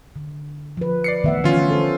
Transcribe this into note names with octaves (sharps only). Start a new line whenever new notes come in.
D3
F3 B4
D5 C7 C#7
D#3 A3 B3 E5 F#5
D3 E3 F3 A3 C#4 F4
A4 C5